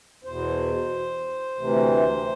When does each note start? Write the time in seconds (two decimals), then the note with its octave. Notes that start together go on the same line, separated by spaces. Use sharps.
0.24 E2 B2 C5
1.58 D2 C3 E3